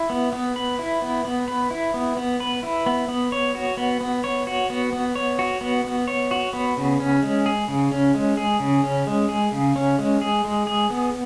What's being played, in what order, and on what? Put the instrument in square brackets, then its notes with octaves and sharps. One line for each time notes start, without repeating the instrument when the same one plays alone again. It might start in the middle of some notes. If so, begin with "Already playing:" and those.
Already playing: [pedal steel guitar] E4
B3
B3
B4
E4
B3
B3
B4
E4
B3
B3
B4
E4
B3
B3
C#5
F#4
B3
B3
C#5
F#4
B3
B3
C#5
F#4
B3
B3
C#5
F#4
B3
C#3
C#4
G#3
G#4
C#3
C#4
G#3
G#4
C#3
C#4
G#3
G#4
C#3
C#4
G#3
G#4
G#3
G#4
B3